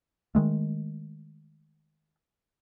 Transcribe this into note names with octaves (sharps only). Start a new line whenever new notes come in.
D#3 G#3 A3